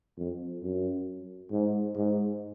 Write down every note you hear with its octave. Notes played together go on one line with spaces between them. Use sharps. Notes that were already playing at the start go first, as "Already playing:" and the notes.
F2
F#2
G#2
G#2